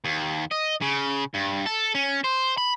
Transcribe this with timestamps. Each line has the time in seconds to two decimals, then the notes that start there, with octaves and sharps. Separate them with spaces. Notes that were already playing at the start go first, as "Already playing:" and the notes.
0.04 D#2
0.52 D#5
0.82 C#3
1.34 G2
1.66 A4
1.95 C#4
2.24 C5
2.58 B5